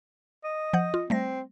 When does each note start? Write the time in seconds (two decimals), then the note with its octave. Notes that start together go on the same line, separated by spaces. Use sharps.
0.44 D#5
0.73 F3 F#5 G6
0.94 F4
1.10 G3 A3 C4 A#6